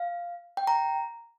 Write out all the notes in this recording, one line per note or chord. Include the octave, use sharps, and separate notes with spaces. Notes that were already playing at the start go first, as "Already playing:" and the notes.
Already playing: F5
G5
A#5